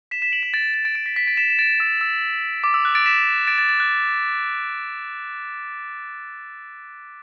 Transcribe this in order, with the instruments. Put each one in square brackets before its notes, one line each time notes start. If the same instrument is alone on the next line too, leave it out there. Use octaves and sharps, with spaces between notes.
[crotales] B6 E7
B6 E7
D7 F#7
B6 E7
A6 D7
B6
A6
A6 D7
A6 D7
B6
B6
A6 D7
B6 E7
E7
A6 D7
E6
E6
D6
E6
F#6
A6 D7
B6 E7
A6 D7
A6 D7
A6
F#6